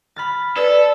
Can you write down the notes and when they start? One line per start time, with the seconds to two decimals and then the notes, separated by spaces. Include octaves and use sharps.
0.16 B5 F6 A6
0.57 A4 B4 D5